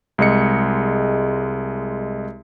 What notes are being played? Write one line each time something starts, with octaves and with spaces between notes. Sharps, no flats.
C2 G#3 G#4 D#5 C#7